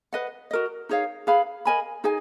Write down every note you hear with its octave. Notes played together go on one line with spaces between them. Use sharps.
B4 D#5 F#5
F#4 A#4 D#5
D#4 G#4 C#5 F5
G#4 B4 F5 B5
A#4 D#5 G#5 B5
D#4 G#4 D#5 G#5